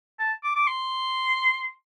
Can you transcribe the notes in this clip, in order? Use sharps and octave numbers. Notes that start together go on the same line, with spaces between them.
A5
D6
D6
C6